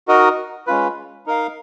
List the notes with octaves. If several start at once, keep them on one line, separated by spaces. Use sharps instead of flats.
D#4 F#4 A#4 D#5
G#3 C#4 F4 B4
D#4 A#4 F5